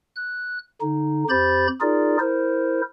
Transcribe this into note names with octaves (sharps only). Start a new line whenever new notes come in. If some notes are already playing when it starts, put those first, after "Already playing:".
F#6
D3 D#4
F2 G4 C5 B5 G6 A6
D#4 F4 G#4 A#4 D5
E4 A#4 C5